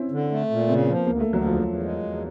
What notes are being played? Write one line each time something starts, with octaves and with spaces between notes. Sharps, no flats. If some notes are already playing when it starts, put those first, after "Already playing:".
Already playing: C4 C#4 E4
D3
A3
A#2
C#3 C4
B3
F3
A#3
D2 A#3
A3
D2
F#3
E2 F3
E2
G#3
E2